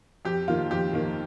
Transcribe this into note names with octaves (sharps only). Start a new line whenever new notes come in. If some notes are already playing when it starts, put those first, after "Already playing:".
F2 G4
D#3 A#3 F4
F2 G4
D#3 A#3